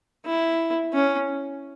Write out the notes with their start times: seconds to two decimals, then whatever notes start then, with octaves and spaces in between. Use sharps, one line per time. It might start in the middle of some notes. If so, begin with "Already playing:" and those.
0.26 E4
0.93 C#4